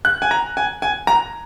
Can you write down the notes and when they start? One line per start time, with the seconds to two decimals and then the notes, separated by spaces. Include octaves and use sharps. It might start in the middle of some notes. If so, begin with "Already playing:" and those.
0.05 F#6
0.22 G#5
0.31 A#5
0.57 G#5
0.82 G#5
1.07 A#5